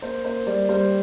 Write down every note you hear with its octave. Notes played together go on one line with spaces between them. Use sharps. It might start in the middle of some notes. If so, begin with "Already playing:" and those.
A#3 C5
A#3 C5
G3 D5
G3 C5